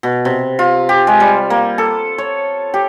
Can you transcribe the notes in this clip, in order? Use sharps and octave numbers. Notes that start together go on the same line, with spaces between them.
B2
C3
F4
G4
G#3
G3
A#3
A4
C#5
G4